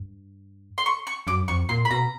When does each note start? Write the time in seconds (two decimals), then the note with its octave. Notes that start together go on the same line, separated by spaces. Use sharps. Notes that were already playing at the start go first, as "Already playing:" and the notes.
Already playing: G2
0.78 C6
0.86 C#6
1.07 C#6
1.27 F#2 D6
1.48 F2 C#6
1.69 A#2 C6
1.85 B5
1.90 B2 A#5